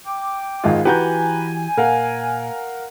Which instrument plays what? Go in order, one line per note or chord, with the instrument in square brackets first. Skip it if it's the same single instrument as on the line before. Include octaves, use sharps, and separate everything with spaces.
[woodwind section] G5 D6
[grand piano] G#1 G#3 F4
[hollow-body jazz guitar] E3 F#4 G4 [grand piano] B4 A#5 G6 [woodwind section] G#5
[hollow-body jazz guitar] A#2 [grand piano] A#4 F5 F#5